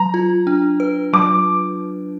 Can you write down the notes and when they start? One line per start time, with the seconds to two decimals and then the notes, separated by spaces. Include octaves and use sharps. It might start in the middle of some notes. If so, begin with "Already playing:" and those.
Already playing: F#3 A#5
0.14 F4
0.47 D4
0.80 B4
1.13 F#3 D6